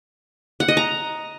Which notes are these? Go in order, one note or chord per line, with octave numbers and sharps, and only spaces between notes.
F#5
D#5
A#5